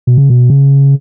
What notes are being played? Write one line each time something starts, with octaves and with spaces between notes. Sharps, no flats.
B2
C#3
B2
C#3